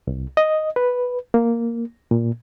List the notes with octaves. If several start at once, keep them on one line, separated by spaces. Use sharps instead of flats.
C2
D#5
B4
A#3
A#2